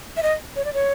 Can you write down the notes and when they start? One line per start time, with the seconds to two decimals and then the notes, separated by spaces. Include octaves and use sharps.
0.17 E5
0.23 D#5
0.56 C#5
0.65 D5
0.73 C#5